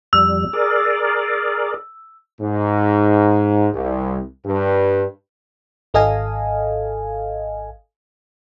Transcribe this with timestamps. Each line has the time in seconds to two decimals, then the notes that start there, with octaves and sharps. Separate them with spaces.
0.13 F2 G3 E6
0.53 G#4 A#4 D5
2.41 G#2
3.74 C2
4.45 G2
5.94 G#1 A4 D#5 F5 G#5